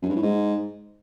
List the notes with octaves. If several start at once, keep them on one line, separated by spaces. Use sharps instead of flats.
F#2
G2
A2
G#2